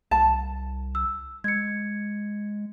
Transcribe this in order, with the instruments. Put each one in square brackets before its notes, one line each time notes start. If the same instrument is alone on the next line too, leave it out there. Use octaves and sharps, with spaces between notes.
[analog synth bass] C2 [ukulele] A5
[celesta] E6
[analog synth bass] G#3 [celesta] G#6 C#7